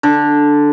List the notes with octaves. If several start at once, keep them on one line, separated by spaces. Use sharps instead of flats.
D3